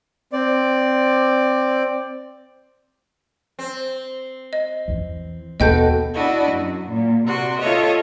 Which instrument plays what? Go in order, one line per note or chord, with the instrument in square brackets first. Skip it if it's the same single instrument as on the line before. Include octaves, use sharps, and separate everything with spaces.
[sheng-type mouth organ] C4 D5
[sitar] C4
[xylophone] D#5
[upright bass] E2 E3
[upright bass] D#2 [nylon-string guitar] B2 F#4 A4 [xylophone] D#5 G5 G6
[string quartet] D4 E4 F#4 D#5
F#2
A#2
C3 F#4 D5 C6
F4 A4 C#5 D#5 E5